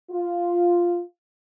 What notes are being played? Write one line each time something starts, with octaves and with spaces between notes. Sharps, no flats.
F4